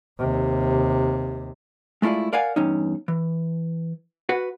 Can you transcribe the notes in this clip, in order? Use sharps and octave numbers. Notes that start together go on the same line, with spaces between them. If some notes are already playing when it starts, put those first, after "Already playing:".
D#2 C3
G#3 A3 E4 F4 D5
A#4 D5 F5 F#5 G#5
E2 G2 C#4 D#4
E3
F#4 B4 F#5